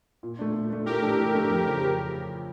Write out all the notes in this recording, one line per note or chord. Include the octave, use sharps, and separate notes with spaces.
A#2
A3 D4
A#2
A3 D4
A2 G4 A#4
E3 A3 D4 A4
A2
E3 A3 D4 A4
F2
C#3 F3